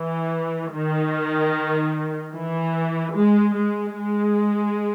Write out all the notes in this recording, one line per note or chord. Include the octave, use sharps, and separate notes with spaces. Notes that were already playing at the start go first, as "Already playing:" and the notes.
Already playing: E3
D#3
E3
G#3
G#3
G#3